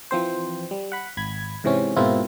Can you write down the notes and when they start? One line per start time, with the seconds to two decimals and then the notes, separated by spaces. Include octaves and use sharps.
0.11 E3 F3 C4 C5
0.71 G3
0.92 F#5 B5
1.17 G#1 B5 G#6
1.64 G#2 C3 E3 C4 C#4
1.96 G#2 B2 A#3 C4 E4 F4